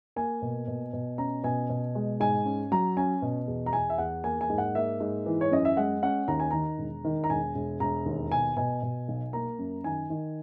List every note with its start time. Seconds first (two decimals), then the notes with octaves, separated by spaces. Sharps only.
0.16 A#3 G#5
0.42 B2
0.68 B2
0.93 B2
1.18 C#4 A#5
1.43 B2 G#5
1.70 B2
1.95 G#3
2.20 G#2 G#5
2.45 C#4
2.72 F#3 A#5
2.97 C#4 G#5
3.22 B2
3.48 E2
3.66 A#5
3.73 E2 G#5
3.90 E5
3.98 E2 F#5
4.24 A#3 G#5
4.41 G#5
4.50 G#2
4.58 F#5
4.75 A#3 E5
5.00 G#2
5.26 E3
5.41 C#5
5.51 F#2 D#5
5.65 E5
5.77 G#3 F#5
6.03 C#4 F#5
6.28 D#2 A#5
6.40 G#5
6.51 D#3 A#5
6.78 E1
7.05 D#3
7.24 A#5
7.30 E1 G#5
7.55 E1
7.80 E1 A#5
8.06 D#2
8.31 B2 G#5
8.57 B2 G#5
8.83 B2
9.08 B1
9.33 A#3 A#5
9.59 F#2
9.84 D#3 G#5
10.10 D#3